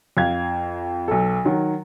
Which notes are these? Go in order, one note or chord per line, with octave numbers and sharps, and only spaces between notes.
F2 F5 G#6
B1 A4
D#3 F#3